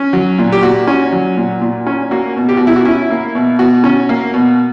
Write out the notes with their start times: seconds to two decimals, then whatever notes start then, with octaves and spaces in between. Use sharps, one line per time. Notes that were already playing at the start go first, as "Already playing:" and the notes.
Already playing: C#4
0.13 F#3
0.38 A#2
0.52 G4
0.63 A#2 F#4
0.87 C#4
1.12 F#3
1.37 A#2
1.61 A#2
1.87 C#4
2.11 A#3 F#4
2.36 B2
2.49 G4
2.57 B2 F#4
2.67 E4
2.76 F#4
2.85 C#4 E4
3.10 A#3
3.35 B2
3.59 B2 F#4
3.84 C#4
4.09 A#3
4.34 B2